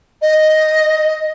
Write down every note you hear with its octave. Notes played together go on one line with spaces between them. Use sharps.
D#5